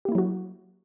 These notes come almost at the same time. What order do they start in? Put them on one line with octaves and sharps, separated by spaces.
G4 A#3 E4 F#3 F#4